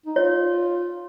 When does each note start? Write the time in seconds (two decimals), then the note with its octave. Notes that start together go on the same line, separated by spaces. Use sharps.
0.06 D#4
0.16 F4 C#5